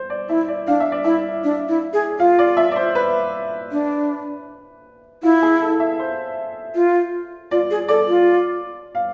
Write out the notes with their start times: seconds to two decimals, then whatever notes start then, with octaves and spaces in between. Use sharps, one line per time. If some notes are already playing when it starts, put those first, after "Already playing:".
Already playing: C5
0.10 D5
0.29 E4 E5
0.48 D5
0.67 D4 F5
0.80 E5
0.92 D5
1.04 E4 E5
1.44 D4
1.68 E4
1.93 G#4
2.19 F4 F5
2.39 D5
2.57 E5
2.72 D5
2.76 C5
2.95 B4
3.72 D4
5.23 E4 F4
5.42 G#4
5.61 A4
5.80 E5
5.99 C5
6.75 F4
7.51 F4 D5
7.71 G#4
7.88 A4 D5
8.08 F4
8.95 F5